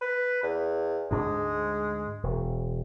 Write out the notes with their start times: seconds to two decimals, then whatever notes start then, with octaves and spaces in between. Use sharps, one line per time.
0.01 B4
0.43 E2
1.11 D2 G#2 G#3 D4
2.23 E1